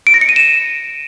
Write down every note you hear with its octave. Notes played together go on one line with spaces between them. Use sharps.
D7
A#6
C#7
D#7
E7